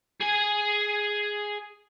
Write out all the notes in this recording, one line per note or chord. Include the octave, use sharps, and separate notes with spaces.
G#4 G#5